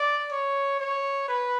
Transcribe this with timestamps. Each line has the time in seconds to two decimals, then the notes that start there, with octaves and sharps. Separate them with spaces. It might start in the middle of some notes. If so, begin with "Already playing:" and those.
Already playing: D5
0.31 C#5
0.79 C#5
1.28 B4